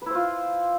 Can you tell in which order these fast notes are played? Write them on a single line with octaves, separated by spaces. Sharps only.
B4 E4 C5 F4